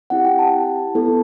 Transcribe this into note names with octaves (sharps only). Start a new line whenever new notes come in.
C4 E4 G4 F#5
G5
A5
B3 E4 A4